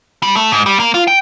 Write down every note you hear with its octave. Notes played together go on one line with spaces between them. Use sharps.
G3
A3
G#2
G3
A#3
F4
G5